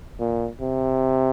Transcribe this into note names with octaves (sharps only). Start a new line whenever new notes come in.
A#2
C3